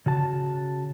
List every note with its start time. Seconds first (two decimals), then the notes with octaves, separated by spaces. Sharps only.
0.06 C#3 F#4 A5